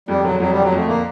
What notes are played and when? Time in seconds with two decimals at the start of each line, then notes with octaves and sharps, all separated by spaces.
0.08 F2 G3
0.24 D3 F#3
0.40 F2 F#3
0.52 D3 G3
0.64 F#3
0.72 F2 A3
0.88 D3 A#3